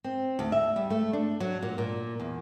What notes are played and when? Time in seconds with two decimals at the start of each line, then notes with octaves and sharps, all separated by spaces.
0.04 C4
0.39 D2
0.52 E5
0.76 G3
0.90 A3
1.13 D4
1.40 F#3
1.63 A#2
1.78 A#2
2.20 E2